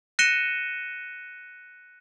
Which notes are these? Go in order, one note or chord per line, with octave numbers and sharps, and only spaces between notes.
F#6 A#6 C#7 D#7 E7 G7